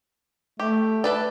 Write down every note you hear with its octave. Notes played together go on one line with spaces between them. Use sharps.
A3 G4
A4 B4 D5